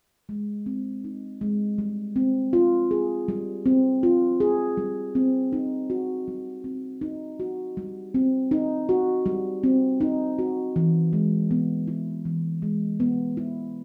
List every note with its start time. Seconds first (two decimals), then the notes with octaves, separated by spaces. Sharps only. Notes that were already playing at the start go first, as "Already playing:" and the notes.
0.29 G#3
0.66 C4
1.04 D#4
1.41 G#3
1.78 G3
2.16 C4
2.53 F4
2.91 G#4
3.28 G3
3.66 C4
4.03 F4
4.40 G#4
4.77 G3
5.15 C4
5.52 D#4
5.90 F#4
6.28 G3
6.64 C4
7.01 D#4
7.40 F#4
7.77 G3
8.14 C4
8.51 D#4
8.89 F#4
9.26 G3
9.63 C4
10.01 D#4
10.39 F#4
10.76 E3
11.13 G#3
11.51 B3
11.88 E4
12.25 E3
12.62 G#3
13.00 B3
13.37 E4